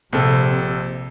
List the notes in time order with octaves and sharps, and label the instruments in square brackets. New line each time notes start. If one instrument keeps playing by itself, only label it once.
[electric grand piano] A#1 C4 A4 [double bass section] C3